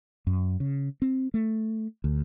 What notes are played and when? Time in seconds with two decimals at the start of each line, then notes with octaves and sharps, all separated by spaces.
0.27 F#2
0.60 C#3
1.02 C4
1.34 A3
2.04 D2